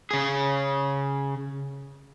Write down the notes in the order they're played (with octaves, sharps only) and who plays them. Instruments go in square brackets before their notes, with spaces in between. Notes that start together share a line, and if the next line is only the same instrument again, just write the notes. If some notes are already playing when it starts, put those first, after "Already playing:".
[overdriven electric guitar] C#3 G#4